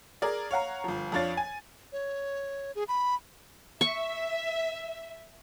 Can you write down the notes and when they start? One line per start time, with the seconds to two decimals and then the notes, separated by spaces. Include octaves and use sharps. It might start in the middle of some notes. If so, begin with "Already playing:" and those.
0.22 G#4 A#4 D5
0.51 C#5 F5 F#5 A#5
0.84 G1 F3
1.12 F2 F3 D4 C#5 F5 A6
1.37 G#5
1.92 C#5
2.75 G#4
2.88 B5
3.81 E5 C#6